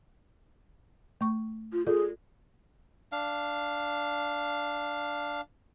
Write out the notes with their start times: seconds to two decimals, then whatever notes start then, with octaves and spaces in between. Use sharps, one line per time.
1.21 A3 C#6
1.73 F4
1.87 F4 G#4 A4 D5
3.12 D4 F5